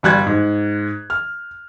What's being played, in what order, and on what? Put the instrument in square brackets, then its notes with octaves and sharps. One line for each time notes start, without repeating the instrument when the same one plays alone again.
[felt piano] G1 G3 F#6 G#6
G#2
F6